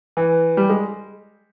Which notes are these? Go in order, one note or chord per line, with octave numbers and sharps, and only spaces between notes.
E3
G3
G#3